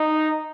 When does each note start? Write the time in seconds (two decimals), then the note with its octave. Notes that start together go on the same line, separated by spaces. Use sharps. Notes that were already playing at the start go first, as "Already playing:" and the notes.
Already playing: D#4